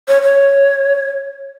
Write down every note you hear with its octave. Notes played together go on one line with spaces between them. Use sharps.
C#5
C#5